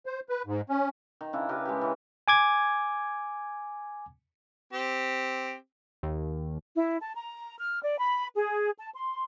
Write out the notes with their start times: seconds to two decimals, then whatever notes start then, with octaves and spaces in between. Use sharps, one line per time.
0.06 C5
0.29 B4
0.46 G#2
0.69 C#4
1.21 D#3
1.33 C#3 D4 E4
1.49 C#3 G4 A#4 B4
1.65 G#3 G4
1.81 E3 C#4
2.28 G#5 D6 G#6
4.73 C4 G4
6.03 D#2
6.76 E4
7.02 A5
7.16 A#5
7.58 F6
7.82 D5
7.99 B5
8.37 G#4
8.79 A5
8.95 C6